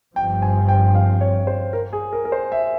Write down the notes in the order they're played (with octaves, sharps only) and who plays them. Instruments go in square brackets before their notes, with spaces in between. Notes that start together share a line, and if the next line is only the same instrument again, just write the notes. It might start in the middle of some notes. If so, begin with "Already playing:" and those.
[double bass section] G1 G2 F3 C4 [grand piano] G5
[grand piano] G#5
G5
F5
C#5
C5
A#4
G#4
A#4
A#4
C5
E5